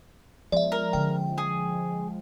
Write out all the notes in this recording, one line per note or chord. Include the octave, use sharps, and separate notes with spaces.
F3 G#3 B3 D5 E5
A#4
D3 C#4 G5
G#4